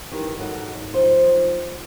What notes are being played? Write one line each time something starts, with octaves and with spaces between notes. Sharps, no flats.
D#3 E3 G3 A#4
G#2 F#3 F#4 A4 D#5
F3 D#4 C5